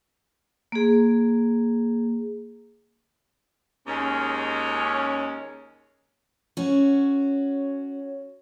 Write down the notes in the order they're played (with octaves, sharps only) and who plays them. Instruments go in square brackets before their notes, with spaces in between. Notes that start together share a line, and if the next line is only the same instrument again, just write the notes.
[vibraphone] A#3 G#4
[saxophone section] D#2 G#3 C#4
[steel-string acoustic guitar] C#4 F#4